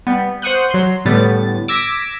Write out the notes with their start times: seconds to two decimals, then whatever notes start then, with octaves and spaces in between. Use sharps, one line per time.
0.07 G3 B3
0.42 C5 F#5 C#6 D#6 F#6 G6
0.71 F#3 C6
1.05 A2 D3 G3 B3 A6
1.68 D6 E6 G#6 A#6 B6 D7